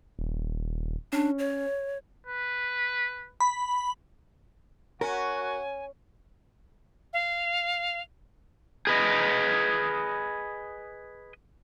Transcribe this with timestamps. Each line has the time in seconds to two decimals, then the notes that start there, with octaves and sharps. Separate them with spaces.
0.19 D#1
1.13 C#4 D4
1.39 C#5
2.27 B4
3.40 B5
5.01 C#4 F#4 A#4 G#5
7.13 F5
8.87 G#4 B4 D#5